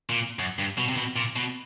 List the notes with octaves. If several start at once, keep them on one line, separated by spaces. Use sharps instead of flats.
A#2
F#2
G2
B2
C3
B2
A#2
B2